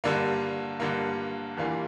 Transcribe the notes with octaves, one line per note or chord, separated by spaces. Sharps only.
G2 D3 G3 A#3
G2 D3 G3 A#3
E2 E3 G3 A#3 F4